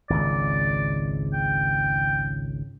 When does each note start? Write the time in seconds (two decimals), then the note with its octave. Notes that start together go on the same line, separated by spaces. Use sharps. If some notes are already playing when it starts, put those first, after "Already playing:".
0.10 G#1 C#2 D5
1.34 G5